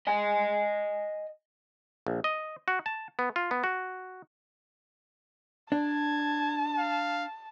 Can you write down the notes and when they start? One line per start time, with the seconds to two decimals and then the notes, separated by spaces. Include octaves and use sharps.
0.07 D#5 G#5
2.07 A#1
2.24 D#5
2.68 F#4
2.86 A5
3.19 B3
3.36 F4
3.51 B3
3.64 F#4
5.72 D4 A5 G#6
6.79 F5